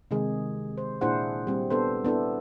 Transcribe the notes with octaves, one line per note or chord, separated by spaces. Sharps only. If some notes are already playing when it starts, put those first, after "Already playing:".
C3 D#3 G#3 G#4
C5
A#2 D4 E4 G#4 C5 F#5
G3 C4
B3 D4 A4 C5
B3 D4 E4 A4